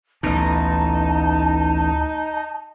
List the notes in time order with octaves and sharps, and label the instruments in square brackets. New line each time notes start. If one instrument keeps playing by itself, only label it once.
[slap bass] A1 B2 [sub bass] D2 [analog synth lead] D#4 [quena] A5